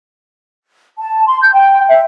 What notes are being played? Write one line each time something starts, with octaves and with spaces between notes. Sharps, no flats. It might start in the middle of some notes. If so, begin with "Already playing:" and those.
A5
C6
G6
G5
E5